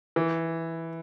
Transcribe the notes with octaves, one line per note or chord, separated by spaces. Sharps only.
E3